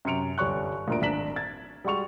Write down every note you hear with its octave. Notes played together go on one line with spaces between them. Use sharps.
F#2 C3 C6 C#7 D7 F7
G1 G3 C#5 C#6 F#6
D2 A#2 A#4 D5 D7
G#1 D4 A#5 B6 E7 F#7
G#6 A6
G3 G#3 F#4 C#6 F7